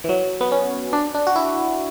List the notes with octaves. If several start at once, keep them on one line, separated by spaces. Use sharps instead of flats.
E3
F#3
B3
C#4
D4
D4
F#4
E4